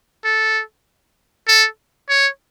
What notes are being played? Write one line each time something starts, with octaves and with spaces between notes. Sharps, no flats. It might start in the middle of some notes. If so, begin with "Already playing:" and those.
A4
A4
C#5